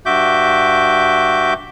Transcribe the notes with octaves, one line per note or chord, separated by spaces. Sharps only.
G2 F#4 E5 D6 G6